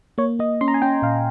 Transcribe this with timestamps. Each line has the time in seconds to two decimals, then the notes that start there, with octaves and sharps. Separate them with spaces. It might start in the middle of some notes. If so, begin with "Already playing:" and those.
0.18 A#3 C#5
0.39 A#3 D#5
0.61 C#4 C6
0.68 A#5
0.74 G#5
0.82 C#4 G5
1.02 A#2 F5